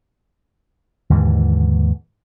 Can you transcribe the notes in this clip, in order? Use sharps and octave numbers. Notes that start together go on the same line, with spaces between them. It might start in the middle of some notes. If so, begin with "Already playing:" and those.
D#2 G#2 D3 E3